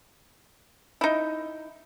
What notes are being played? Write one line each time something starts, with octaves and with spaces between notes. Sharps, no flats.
D#4 E4